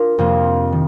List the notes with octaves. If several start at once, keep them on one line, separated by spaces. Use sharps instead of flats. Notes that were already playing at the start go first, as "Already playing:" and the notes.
Already playing: D4 F4 A#4
F2 C3 F3 A#3
D#3